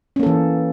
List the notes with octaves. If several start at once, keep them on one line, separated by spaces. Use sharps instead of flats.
E3 A#3 C#4 A4